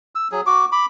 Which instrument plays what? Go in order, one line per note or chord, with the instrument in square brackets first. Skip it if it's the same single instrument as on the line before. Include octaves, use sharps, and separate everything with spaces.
[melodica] E6
F#3 G#4
F#4 D6
B5 D6